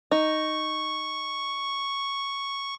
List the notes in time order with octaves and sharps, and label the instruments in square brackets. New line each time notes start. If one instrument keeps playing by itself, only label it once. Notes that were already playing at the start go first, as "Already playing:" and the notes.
[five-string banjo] D#4 [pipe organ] C#6